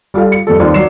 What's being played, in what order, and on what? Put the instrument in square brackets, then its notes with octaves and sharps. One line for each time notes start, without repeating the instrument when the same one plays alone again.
[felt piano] G3 F4 A4 F5
C#7
F2 G3 A4
D#2 F4 C5 D5
F#3 D5 C7 E7